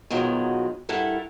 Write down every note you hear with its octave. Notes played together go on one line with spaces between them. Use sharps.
B2 D#3 F3 F#3 G#3
G2 E4 A4 A#4 F#5